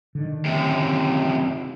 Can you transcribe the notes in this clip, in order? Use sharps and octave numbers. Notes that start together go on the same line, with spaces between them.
D3 D#3
F#2 C3